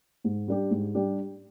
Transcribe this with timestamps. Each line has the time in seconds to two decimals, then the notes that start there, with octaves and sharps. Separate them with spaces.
0.24 G#2
0.48 G3 D4 G4
0.71 G#2
0.95 G3 D4 G4